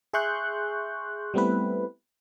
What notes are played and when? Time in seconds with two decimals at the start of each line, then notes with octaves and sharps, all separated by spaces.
0.13 G#4 E5 C6 C#6 F#6 G6
1.34 G3 A3 B3 C4 E4 B4